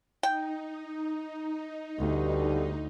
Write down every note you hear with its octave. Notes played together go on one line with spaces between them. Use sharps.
D#4 G5
D2 B2 G3 A3